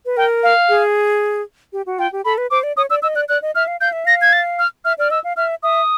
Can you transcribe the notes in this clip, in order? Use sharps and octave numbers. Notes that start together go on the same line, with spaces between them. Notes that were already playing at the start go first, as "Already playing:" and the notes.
B4
A#4 G5
F5
G#4
G4
F#4
F4 G5
G4
A4 B5
B4
C5 D6
D5
C#5 D#6
D5 E6
D#5 E6
D5 F#6
D5 F#6
D#5
E5 F6
F5
F5 G6
E5
F5 A#6
G#6
A6
F6
E5 F6
D5 F6
D#5 E6
F5
E5 F6
E5 D#6